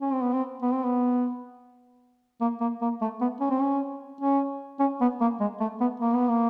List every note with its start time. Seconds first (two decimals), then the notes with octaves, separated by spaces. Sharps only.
0.02 C#4
0.13 C4
0.22 B3
0.33 C4
0.62 B3
0.73 C4
0.84 B3
2.41 A#3
2.61 A#3
2.81 A#3
3.01 A3
3.21 B3
3.40 C#4
3.50 C4
3.61 C#4
4.21 C#4
4.80 C#4
5.01 B3
5.21 A#3
5.40 G#3
5.60 A3
5.81 B3
6.00 A#3
6.14 B3
6.29 A#3